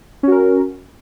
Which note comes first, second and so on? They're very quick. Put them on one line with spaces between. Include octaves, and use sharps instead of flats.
C#4 F#4 A#4